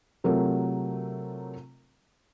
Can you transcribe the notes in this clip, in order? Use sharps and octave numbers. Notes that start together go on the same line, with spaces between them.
C3 F#3 A3 C4 F4 A#4